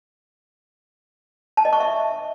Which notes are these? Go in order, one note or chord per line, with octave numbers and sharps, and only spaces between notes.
A5
D#5
C#6
E5